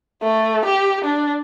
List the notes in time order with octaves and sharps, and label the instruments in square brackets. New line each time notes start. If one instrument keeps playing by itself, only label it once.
[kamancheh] A3
G4
D4